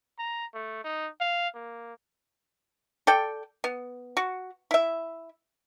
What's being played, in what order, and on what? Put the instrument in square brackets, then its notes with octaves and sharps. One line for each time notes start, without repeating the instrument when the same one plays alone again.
[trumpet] A#5
A3
D#4
F5
A#3
[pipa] A4 D5 G5
B3
F#4
E4 E5